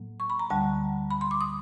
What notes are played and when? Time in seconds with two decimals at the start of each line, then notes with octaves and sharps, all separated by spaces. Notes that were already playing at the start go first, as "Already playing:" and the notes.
Already playing: A2 F#3 A#3
0.20 C#6
0.30 B5
0.39 A#5
0.50 D2 D3 G3 A5
1.11 B5
1.21 C6
1.31 D6
1.41 D#6